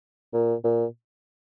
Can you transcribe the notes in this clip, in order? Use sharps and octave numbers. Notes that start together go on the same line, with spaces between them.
A#2
A#2